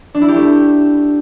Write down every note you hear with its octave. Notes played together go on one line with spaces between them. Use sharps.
D4
E4
G4
A3